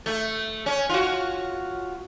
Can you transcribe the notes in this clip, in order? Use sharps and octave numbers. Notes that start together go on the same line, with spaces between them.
A3
C#4
F4 F#4